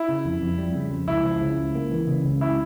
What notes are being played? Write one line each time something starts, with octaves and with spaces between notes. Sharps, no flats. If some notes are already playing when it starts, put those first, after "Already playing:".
Already playing: E4
C#3
F2
F2
G3
C#3
F2
C#2 E4
F3
C#3
C#2
A#3
E3
C#3
C#2
E4